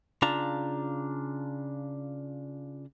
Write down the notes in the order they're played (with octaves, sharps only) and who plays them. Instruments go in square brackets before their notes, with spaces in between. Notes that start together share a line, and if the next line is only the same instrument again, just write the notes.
[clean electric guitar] C#3 D4 F4 A5 A#5